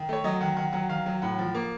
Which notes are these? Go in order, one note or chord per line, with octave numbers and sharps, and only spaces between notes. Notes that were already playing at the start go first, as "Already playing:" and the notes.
Already playing: D#3
A3 C#5
F#3 D#5
D#3 F#5
D#3 F#5
F#3 F#5
D#3 F5
F#3
A2 F#5
F3
A#3